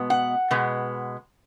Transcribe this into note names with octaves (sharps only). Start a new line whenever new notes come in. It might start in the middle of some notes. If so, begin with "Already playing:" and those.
Already playing: B2 G#3 B3
F#5
B2 G#3 B3